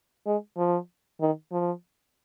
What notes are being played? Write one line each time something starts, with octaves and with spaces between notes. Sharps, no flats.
G#3
F3
D#3
F3